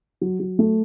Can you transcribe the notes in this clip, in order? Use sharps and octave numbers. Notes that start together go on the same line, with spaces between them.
F#3
F#3
A3